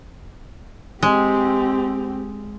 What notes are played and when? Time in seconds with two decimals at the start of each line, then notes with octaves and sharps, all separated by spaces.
1.03 G#3 C4 G4